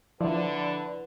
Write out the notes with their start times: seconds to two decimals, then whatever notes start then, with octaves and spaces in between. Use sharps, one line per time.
0.21 D3 F3 E4 B4 D5